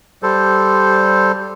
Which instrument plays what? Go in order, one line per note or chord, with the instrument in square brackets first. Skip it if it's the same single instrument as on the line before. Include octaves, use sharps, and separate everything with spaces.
[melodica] G3 A4 C5